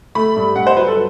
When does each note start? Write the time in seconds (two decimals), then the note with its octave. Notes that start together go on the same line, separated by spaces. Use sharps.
0.15 A3 B5
0.36 G2
0.56 G2 F#5
0.67 C5
0.76 F#3 B4
0.88 A4